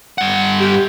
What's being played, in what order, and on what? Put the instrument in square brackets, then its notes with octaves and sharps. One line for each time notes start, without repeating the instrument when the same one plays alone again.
[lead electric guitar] G2 F#5
[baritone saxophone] G4